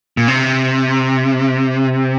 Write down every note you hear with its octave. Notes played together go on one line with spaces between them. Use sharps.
A#2
C3